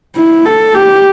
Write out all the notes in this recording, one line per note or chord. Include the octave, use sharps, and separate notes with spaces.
E4
A4
G4